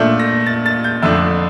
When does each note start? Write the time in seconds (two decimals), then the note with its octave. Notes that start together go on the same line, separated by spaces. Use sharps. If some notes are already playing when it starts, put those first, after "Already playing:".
Already playing: A#2 A3 D4 G6
0.19 A#6
0.46 A6
0.66 A6
0.84 G6
1.02 F2 D3 A3 D4 E6